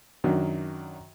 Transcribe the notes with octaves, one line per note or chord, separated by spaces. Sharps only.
F#2 D#3 F#3 D4